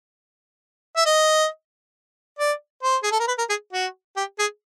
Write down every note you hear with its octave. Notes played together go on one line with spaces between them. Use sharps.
E5
D#5
D5
C5
G#4
A4
A#4
B4
A#4
G#4
F#4
G4
G#4